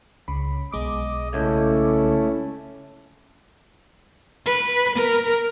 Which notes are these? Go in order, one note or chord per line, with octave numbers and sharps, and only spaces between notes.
C#2 C#3 B5
B1 G#3 D#5 D6
C#2 A3 C#4 E4 A4
B4
A#4